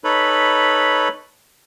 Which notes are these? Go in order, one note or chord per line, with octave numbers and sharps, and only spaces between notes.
D#4 A4 B4 C#5 B5